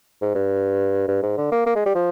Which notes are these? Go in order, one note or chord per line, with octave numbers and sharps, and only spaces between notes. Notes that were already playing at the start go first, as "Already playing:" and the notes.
G#2
G2
G2
G#2
D3
A#3
A#3
G#3
G3
F3